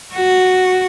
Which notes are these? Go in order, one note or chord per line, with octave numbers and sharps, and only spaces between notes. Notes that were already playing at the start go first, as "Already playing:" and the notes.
F#4